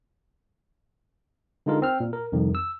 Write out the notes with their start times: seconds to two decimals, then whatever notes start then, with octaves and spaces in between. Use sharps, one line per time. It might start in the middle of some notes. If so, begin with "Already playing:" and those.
1.66 D3 G#3 D#4 F4 A#4
1.82 C4 F6
2.00 A#2
2.13 A#4
2.32 C2 F2 D#3
2.55 E6